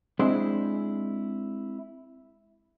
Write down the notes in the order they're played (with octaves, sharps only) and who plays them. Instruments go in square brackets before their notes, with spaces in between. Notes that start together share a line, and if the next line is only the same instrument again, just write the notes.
[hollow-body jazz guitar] G#3 C4 D4 E4 G#4